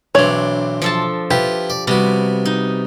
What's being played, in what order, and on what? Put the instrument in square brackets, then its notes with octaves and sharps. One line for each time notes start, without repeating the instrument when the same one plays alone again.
[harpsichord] B1 E3 C4 [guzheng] D4 [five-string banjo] C#5
[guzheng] F3 A4 A5
[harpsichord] E4 F4 B4 [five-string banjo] G4
[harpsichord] D5
[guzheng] C3 [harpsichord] G3 B3 F#4
[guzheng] D#4